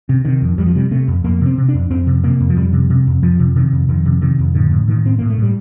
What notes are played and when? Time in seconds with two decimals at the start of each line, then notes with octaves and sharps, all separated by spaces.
0.09 C3
0.25 C3 D#3
0.42 F2
0.58 F2 G3
0.67 F3
0.75 C3 G3
0.91 C3 A3
1.08 F2
1.24 F2 A#3
1.41 C3 C4
1.58 C3
1.68 D4
1.74 F2
1.90 F2 C4
2.07 C3
2.23 C3 A#3
2.40 F2
2.50 F3
2.56 F2 G3
2.73 C3
2.90 C3
3.07 F2
3.23 F2 F3
3.39 C3
3.56 C3 D#3
3.72 F2
3.89 F2 D#3
4.05 C3
4.21 C3 D#3
4.39 F2
4.55 A2 D3
4.71 A2
4.88 A2 D#3
5.05 A2 C4
5.18 A2 A#3
5.30 A3
5.38 A2 G3